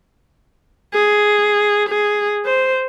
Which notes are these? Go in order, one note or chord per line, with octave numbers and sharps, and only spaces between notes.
G#4
G#4
C5